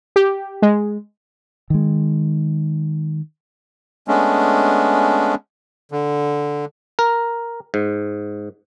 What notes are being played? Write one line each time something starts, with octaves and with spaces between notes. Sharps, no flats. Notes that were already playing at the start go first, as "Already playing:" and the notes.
G4
G#3
D#3 G#3
G#3 A3 B3 C#4 D4
D3
A#4
G#2